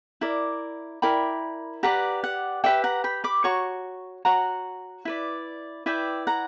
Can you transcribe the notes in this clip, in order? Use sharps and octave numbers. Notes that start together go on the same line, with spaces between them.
E4 A#4 D5
E4 A#4 D5 G5 B5
G4 B4 D5 F#5 A#5
F#5
G4 B4 D5 E5 G5
F#5 A#5
G5 B5
B5 D6
F#4 C#5 A#5 C#6
F#4 C#5 F#5 A#5
E4 B4 D5
E4 B4 D5 E5 G5
F#5 A#5